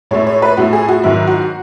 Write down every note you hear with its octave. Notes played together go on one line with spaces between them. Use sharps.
A2 G#3 B3 E4 C#5
C#5
B4
A2 G#3 B3 E4 F#4
G#4
F#4
G#2 D#3 F#3 B3 E4
F#4